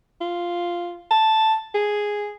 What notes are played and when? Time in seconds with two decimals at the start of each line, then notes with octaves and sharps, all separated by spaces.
0.21 F4
1.11 A5
1.74 G#4